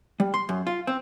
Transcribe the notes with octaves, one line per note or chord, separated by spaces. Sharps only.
G3
C6
F#2
F4
C4